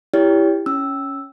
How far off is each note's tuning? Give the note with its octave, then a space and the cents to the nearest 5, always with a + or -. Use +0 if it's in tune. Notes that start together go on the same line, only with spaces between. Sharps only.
E4 +10 G4 +15 C#5 +35
C#4 +0 E6 -5